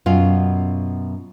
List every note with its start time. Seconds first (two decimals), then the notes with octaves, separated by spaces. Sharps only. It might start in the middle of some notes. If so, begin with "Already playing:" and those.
0.06 F#2 B2 F4